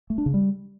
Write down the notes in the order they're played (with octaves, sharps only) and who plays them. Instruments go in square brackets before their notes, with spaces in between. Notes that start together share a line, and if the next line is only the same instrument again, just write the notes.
[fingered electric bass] A3
D4
C#3
G3